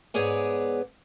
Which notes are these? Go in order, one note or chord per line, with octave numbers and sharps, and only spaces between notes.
G#2 B3 G#4 C#5 D5 G#5